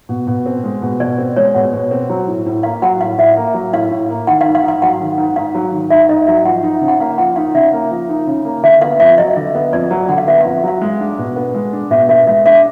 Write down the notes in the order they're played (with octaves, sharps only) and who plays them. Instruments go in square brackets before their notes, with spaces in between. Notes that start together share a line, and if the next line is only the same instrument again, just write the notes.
[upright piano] B2
B2
C4
G#3
B2
[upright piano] B2 [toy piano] D5
[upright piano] C4
[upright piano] G#3 [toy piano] C#5
[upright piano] B2 [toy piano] F#5
[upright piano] B2
C4
F#3
A2
A2
[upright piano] A#3 [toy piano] F5
[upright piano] F#3 [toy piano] F#5
[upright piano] A2 [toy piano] F5
[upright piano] A2 [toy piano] E5
[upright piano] A#3
F#3
[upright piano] A2 [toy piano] F5
[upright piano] A2
A#3
[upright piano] D#3 [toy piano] F#5
[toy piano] F5
[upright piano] G#2
[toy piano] F5
[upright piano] G#2
[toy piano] F5
[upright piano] F#3 [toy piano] F#5
[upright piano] D#3
G#2
[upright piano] G#2 [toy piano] F5
[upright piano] F#3
D#3
[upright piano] G#2 [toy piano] E5
[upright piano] G#2 [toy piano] D#5
[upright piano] F#3 [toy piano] E5
[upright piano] F3 [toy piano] F#5
[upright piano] D#4
C#3
[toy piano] F#5
[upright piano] A#3 [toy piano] F5
[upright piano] F3 [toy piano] F#5
[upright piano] D#4 [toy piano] F5
[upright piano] C#3 [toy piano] E5
[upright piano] A#3
F3
D#4
C#3
A#3
[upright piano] D3 [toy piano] E5
[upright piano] B3 [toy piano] F5
[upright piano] F2 [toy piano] E5
[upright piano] F#3 [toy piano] D#5
[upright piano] D3
B3
[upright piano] F2 [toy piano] D5
[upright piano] F#3
[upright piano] D3 [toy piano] F#5
[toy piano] F5
[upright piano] B3 [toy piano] E5
[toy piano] F5
[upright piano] F2
[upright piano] F#3 [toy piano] F5
[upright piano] G#3
D4
B2
B3
G#3
D4
[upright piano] B2 [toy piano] E5
[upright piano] B3 [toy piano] E5
[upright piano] G#3 [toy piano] E5
[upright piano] D4 [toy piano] E5